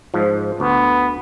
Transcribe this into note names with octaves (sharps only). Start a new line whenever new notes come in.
G#2 F3
D2 B3